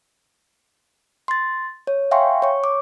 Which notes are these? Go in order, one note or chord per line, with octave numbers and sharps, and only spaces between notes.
C6 A6
C#5
E5 F5 G5 G#5 C6 C#6
C#5 C#6
D6